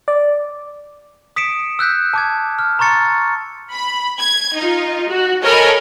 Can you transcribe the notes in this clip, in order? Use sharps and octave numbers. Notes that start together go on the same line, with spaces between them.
D5
D#6 B6 C#7 D7 E7
E6 F#6 G6 B6
A5 D6 G#6
F6
A#5 C6 C#6 A6 C#7
B5
G#6
D#4 F4
F#4
A4 A#4 C#5 D#5 G#5 B5